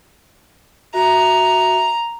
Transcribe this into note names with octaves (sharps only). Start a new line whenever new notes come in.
F#4 E5 A#5